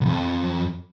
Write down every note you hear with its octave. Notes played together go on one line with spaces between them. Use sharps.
C2 F2